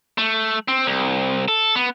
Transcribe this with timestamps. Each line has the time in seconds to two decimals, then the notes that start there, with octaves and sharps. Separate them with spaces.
0.18 A3
0.68 C4
0.86 C2
1.48 A4
1.76 B3